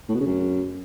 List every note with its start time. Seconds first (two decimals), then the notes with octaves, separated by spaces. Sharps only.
0.09 A2
0.14 B2
0.20 C#3
0.26 F#2